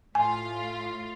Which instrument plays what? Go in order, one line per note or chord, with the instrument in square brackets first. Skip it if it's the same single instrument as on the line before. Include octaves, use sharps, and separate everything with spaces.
[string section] A2 F4 F5 [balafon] G#5